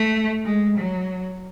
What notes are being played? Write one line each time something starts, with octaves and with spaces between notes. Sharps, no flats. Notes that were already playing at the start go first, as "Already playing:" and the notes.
Already playing: A3
G#3
F#3